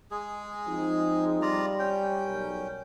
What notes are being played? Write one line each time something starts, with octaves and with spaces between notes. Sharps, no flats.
G#3 G#4
F3 C4 D#4
G3 F4 D5 A#5
C#4 G5
B1 A#4